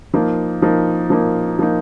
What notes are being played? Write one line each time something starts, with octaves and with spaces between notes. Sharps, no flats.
F3 A#3 D#4
F3 A#3 D#4
F3 A#3 D#4
F3 A#3 D#4